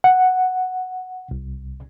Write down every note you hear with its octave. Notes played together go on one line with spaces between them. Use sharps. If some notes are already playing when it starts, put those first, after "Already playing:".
F#5
C2